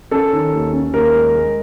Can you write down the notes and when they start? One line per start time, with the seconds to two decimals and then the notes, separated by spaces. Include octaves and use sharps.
0.11 C#4 A4
0.33 D#3
0.52 D#2
0.73 C#4
0.93 D#2 A#4
1.14 G#3
1.35 G#3